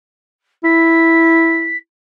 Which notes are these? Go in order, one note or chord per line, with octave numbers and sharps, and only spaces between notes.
E4 B6